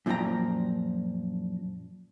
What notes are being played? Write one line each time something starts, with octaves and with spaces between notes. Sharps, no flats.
F#2 A#2 F3 G4 G5 A#5